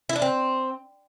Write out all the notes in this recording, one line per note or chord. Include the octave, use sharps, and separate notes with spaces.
E4
D4
C4